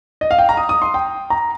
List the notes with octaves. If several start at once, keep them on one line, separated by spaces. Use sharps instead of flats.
D#5
F5
G5
A#5
D#6
D#6
C6
G5
A#5